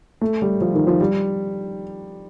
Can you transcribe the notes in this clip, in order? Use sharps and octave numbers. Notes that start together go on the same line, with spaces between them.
A3
G3
F3
D#3
F3
G3